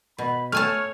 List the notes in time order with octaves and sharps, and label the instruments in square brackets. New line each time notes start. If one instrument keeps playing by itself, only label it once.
[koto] B2 [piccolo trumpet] B5
[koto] A3 G#5 A5 [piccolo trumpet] C#5 [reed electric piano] F6